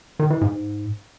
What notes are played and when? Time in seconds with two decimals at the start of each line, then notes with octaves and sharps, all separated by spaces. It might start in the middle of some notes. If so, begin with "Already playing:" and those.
0.19 D#3
0.30 E3
0.41 G#2